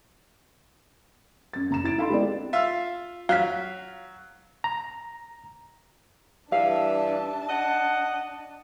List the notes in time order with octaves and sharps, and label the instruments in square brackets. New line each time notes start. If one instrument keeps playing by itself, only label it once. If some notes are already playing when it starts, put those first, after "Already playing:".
[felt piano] F#2 A6
F#1 A#5 E7
E4 A6 D7
D#4 A4 F5 B5 C6
G#3 B3 C4 D4 E4 D5
[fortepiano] F4 E5 F5
[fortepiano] F#3 F6 [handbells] F5 B6
[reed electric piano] A#5
[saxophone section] G2 E3 E5 [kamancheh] D4 A5 [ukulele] F5
[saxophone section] D#5 F#5